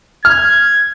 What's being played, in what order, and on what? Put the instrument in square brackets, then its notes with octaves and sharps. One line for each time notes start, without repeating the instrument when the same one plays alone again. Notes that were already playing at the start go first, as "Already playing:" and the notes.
[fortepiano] F6 [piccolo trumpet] G#6